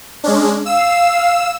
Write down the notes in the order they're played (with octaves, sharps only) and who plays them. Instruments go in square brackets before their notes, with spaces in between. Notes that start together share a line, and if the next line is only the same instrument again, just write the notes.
[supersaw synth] G#3 C#4 D4
[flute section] F5 [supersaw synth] E6 E7